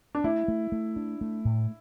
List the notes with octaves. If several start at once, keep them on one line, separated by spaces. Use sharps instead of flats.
D4
A3 E4
A3
A3
D4
A3
A2